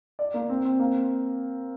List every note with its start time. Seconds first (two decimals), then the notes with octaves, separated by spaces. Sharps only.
0.19 D5
0.34 A#3
0.49 C4
0.65 C4
0.79 A#3